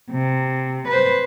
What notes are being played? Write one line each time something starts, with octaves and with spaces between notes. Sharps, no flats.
C3
B4 C5